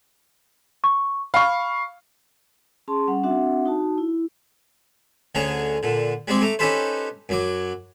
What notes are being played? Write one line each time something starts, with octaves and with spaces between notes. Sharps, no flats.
C#6
F5 B5 C#6
C#4 G#4 A5 C6
G3 C#4 F#5
C4 D4 F#4 E5 F#5
D#4 F#4 A5
E4
D2 D3 C#4 G#4 A#5
A#2 D3
G3 G#3 C4 D5
A3 A#5 D6
C#4 D#4 G4 A4 B4 C5
F#2 F#3 D6